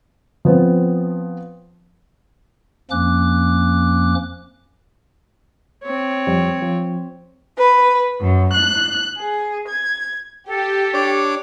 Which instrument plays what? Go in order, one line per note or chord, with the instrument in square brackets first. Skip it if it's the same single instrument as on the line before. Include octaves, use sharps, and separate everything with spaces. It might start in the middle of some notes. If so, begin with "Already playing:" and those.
[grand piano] F3 B3 C4
[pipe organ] F2 F3 A#3 C#4 D6 F#6
[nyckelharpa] C4 C#5
[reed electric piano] F2 G3
F3
[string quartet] B4
F#2
F#6
G#4
G#6
[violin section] G4 [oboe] A4
[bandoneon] D4 C#5 D6